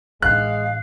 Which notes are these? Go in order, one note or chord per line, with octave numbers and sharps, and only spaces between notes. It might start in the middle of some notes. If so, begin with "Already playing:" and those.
A1 G#3 D4 F5 F#6